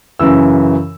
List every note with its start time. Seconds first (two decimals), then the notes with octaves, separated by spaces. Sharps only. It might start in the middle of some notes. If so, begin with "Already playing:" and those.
0.19 F#2 C#3 E3 E6